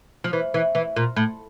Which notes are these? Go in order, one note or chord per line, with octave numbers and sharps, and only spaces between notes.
F3
E3
E3
E3
A#2
A2